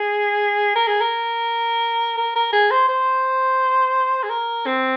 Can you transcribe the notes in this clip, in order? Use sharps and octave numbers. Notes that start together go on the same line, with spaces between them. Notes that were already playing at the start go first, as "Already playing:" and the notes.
Already playing: G#4
A#4
G#4
A#4
A#4
A#4
G#4
C5
C5
G#4
A#4
C4